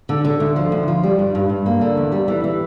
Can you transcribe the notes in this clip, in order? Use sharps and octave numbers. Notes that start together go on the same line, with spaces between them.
D3
D3
D2
F3
D2
F3
G3
G2
G2
G2
A#3
D3
E2
G3
E3
E3